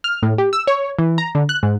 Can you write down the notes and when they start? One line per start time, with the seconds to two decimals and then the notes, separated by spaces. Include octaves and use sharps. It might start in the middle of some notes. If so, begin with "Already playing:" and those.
0.04 F6
0.23 A2
0.38 G4
0.53 E6
0.67 C#5
0.99 E3
1.18 A#5
1.35 D3
1.49 F#6
1.63 G#2